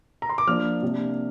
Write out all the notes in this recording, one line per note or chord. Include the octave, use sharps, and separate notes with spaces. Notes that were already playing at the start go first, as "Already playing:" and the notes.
A#5
C6
D6
F3 A#3 D4 F6
C3 A#3 D4